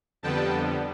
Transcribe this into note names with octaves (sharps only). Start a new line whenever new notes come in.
F2 D3 G3 B3 G5 A5